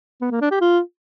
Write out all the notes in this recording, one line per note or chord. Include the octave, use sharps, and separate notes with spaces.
B3
A#3
D4
G4
F4